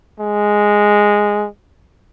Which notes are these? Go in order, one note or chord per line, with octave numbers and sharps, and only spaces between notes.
G#3